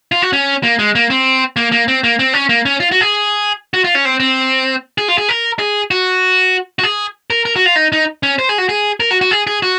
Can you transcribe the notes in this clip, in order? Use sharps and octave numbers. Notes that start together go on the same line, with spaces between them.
F4
F#4
C#4
A#3
G#3
A#3
C4
A#3
A#3
C4
A#3
C4
C#4
A#3
C#4
F4
F#4
G#4
F#4
F4
C#4
C4
C4
G#4
F4
G#4
A#4
G#4
F#4
F#4
G#4
A#4
A#4
F#4
F4
D#4
D#4
C#4
C5
G#4
F#4
G#4
A#4
F#4
F#4
G#4
G#4
F#4